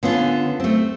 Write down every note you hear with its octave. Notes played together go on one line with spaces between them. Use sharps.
D3 B3 C#4 F4
A3 C4